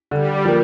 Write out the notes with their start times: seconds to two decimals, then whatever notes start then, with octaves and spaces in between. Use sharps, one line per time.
0.11 D3 G3
0.45 F3 A#3